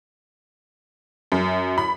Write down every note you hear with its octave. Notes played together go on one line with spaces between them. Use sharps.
F#2
B5